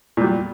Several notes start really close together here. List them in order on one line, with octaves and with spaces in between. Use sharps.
A#2 G3 F#3